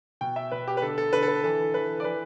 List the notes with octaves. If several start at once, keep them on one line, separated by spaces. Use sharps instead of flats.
B2 G5
E5
B2 B4
G4
B4
D3 A4
A4
D3 B4
A4
B4
E3 A4
E3 B4
D5
E3 B4